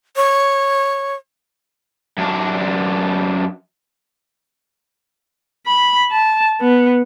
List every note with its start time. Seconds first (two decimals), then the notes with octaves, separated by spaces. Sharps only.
0.16 C#5
2.18 F#2 D4
5.67 B5
6.11 A5
6.61 B3